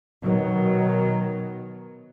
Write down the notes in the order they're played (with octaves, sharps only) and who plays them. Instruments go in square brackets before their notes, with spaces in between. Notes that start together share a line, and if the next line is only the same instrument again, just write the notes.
[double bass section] B2 D#3 F#3